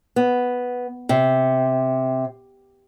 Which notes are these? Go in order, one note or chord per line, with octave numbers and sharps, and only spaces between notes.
B3
C3